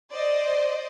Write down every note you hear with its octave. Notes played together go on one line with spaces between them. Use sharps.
C5 D5 D#5